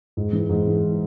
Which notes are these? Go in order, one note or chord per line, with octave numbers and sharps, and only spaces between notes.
G#2
E3
G#2
E3